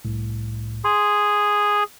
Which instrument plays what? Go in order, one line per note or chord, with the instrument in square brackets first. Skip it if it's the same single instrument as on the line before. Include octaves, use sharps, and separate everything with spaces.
[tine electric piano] C2 A2
[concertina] G#4 [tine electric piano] C6